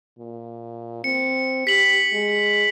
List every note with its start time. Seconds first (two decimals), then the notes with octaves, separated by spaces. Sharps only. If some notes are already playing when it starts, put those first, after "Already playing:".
0.19 A#2
1.04 C4 C#7
1.67 G4 B6 F#7
2.13 G#3